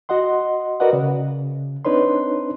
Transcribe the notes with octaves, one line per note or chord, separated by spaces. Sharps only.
F#4 D#5 F#5 C6
F#4 A#4 B4 D5 D#5 F#5
C#3
C4 D4 D#4 B4 C#5 C6